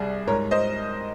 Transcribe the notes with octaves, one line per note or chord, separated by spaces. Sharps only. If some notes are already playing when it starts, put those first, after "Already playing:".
Already playing: C2 G3 G#4
G#2 A#4 C#5
C5 D#5